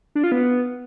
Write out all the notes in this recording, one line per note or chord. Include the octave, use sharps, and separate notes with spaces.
D4
F4
B3